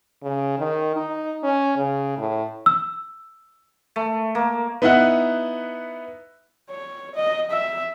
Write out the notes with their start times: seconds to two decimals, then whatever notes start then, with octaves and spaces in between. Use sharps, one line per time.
0.23 C#3
0.59 D#3
0.96 D#4
1.43 C#4
1.77 C#3
2.18 A2
2.66 E6
3.96 A3
4.35 A#3
4.82 B3 D#4 E4 E5 F#5 F#6
6.70 C#5
7.15 D#5
7.51 E5